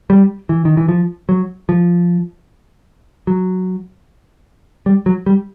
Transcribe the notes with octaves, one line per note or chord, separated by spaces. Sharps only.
G3
E3
D#3
E3
F3
F#3
F3
F#3
G3
F#3
G3